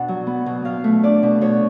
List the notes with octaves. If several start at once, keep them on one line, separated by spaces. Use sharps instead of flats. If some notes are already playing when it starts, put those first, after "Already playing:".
Already playing: B2 B3 D4 F#5
F#3
B3
B2
B2 F5
A3
D4 D5
B2
B2 C#5